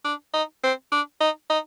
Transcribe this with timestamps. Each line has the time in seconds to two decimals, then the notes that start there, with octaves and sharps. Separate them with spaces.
0.05 D4
0.33 D#4
0.64 C4
0.92 D4
1.21 D#4
1.50 D#4